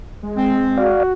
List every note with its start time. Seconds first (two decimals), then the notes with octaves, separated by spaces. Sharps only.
0.23 G#3
0.36 C4
0.77 F#4 D5 F5